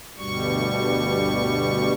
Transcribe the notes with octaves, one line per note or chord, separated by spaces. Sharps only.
D2 G2 B2 G3 C#6